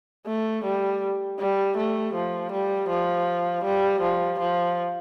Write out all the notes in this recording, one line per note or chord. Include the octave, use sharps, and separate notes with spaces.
A3
G3
G3
A3
F3
G3
F3
G3
F3
F3